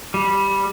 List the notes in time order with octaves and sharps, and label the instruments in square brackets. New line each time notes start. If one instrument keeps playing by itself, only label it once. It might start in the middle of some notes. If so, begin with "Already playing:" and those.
[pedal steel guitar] G3